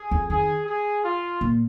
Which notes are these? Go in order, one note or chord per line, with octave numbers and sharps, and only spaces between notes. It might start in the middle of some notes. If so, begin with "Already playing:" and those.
Already playing: G#4
F2
D#3 G#4
G#4
F4
A#2